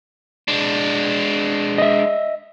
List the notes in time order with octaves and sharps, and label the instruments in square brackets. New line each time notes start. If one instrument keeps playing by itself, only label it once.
[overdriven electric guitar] G#3 D4
[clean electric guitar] D#5 E5